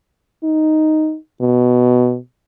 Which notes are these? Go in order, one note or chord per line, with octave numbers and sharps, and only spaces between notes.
D#4
B2